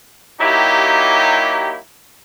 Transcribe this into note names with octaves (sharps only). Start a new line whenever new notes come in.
F#3 A#3 D#4 E4 G4